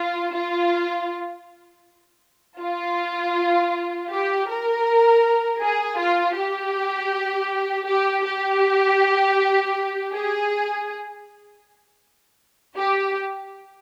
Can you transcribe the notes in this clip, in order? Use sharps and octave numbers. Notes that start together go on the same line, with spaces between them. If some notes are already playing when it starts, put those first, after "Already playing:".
Already playing: F4
F4
F4
G4
A#4
G#4
F4
G4
G4
G4
G#4
G4